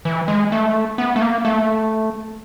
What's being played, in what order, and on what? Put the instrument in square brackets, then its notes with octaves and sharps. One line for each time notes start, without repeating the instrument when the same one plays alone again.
[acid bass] E3
G#3
A3
B3
A3
A#3
A3